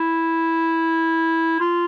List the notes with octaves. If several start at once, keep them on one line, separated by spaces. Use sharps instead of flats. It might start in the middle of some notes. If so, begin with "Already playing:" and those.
Already playing: E4
F4